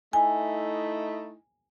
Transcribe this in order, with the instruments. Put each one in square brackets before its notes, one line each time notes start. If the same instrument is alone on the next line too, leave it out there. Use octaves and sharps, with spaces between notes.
[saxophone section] A3 D#4 E4 [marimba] G#5